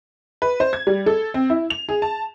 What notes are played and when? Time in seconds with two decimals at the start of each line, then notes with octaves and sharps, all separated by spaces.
0.42 B4
0.60 C5
0.73 G#6
0.87 G3
1.06 A4
1.34 C4
1.50 E4
1.70 F7
1.89 G#4
2.02 A5